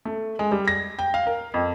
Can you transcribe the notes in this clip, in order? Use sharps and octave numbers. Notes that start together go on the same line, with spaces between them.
A3
G#3
G3
A#6
G5
F5
A#4
F2